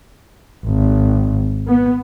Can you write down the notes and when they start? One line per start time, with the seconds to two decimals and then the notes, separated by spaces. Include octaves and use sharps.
0.65 G#1
1.67 B3